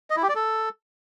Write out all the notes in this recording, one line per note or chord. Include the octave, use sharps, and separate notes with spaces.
D#5
E4
G4
D5
A4